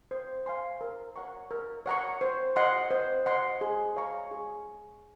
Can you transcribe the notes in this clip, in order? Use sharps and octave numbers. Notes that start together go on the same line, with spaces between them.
C5
F5 G#5 C6
A#4
C#5 F#5 A#5 C#6
A#4
C#5 F#5 A#5 C#6
C5
D#5 F#5 C6
C5
D#5 F#5 C6
G#4
C#5 F5 A#5 C#6
G#4